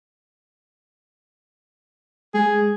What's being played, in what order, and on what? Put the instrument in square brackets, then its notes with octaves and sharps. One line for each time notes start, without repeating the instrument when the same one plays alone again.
[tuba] G#3 [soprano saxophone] G#4